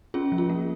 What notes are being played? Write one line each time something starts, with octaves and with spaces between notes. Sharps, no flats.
C#4 F4 G#4
F3
F4
A#3